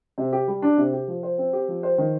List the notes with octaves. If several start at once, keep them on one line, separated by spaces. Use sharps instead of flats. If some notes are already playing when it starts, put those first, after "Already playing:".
C3
G4
G3
D4
C3
G4
F3
C5
C4
G4
F3
C5
D#3